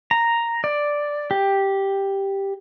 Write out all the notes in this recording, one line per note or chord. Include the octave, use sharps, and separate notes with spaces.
A#5
D5
G4